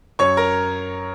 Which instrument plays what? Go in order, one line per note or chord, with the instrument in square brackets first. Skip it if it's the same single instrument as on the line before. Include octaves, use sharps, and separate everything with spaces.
[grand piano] F#2 C#5 C#6
A#4 A#5